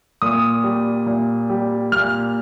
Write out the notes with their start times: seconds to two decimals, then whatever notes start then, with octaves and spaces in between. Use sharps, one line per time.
0.22 A#2 D#6
0.64 G3
1.06 A#2
1.50 G3
1.92 A#2 F6